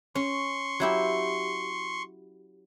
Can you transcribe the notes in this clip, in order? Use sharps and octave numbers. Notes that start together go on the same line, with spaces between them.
C#4 C6 C#6
F#3 E4 G4